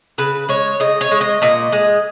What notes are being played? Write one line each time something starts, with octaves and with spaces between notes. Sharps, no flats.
C#3 B4
G#3 C#5
C#3 D#5
C#5
G#3
D#5
A#2 D#5
G#3